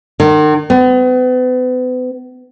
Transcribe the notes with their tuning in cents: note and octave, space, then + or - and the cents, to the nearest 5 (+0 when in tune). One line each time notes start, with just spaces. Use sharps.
D#3 -40
B3 +40